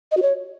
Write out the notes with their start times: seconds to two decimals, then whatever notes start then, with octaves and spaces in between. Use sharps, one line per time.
0.12 D#5
0.17 F#4
0.22 C#5